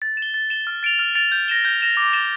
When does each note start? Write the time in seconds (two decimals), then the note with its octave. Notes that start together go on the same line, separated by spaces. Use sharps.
0.02 A6
0.17 E7
0.22 G7
0.34 A6
0.50 E7 G7
0.67 F6
0.83 A6 D7 F7
0.99 F6
1.15 A6 D7 F7
1.32 G6
1.48 A#6 E7 G7
1.65 G6
1.81 A#6 E7 G7
1.97 D6
2.13 A6 E7 G7